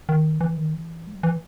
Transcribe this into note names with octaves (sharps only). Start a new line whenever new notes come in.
D#3
E3
D#3
E3
G#3
F#3
E3